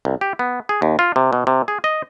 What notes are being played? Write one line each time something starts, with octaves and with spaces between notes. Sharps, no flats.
C2
G4
B3
G#4
D#2
F4
C3
B2
C3
G#4
D#5